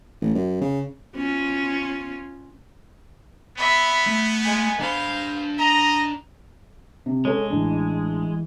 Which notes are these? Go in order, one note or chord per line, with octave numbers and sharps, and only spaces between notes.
A1
F#2
C#3
C#4 F4
B3 E5 B5
A3
G#3 G#5
D4 C5 F5 B5
D#5 A#5
C3
G#3 C#4 A4 C#5
A1 E3 D4